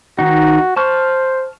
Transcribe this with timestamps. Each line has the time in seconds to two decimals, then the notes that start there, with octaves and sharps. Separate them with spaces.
0.19 D#3 D#4 F#4
0.76 C5 A5 C#6 F6